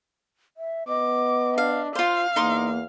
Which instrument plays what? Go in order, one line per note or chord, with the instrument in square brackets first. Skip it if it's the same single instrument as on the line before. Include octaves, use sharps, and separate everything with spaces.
[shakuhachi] E5
[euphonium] B3 [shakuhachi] D#5 [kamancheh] D6
[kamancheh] D4 [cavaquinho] F5
[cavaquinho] F4 C5 [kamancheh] F5
[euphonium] E2 [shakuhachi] A#3 [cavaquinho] D#4 C6 D6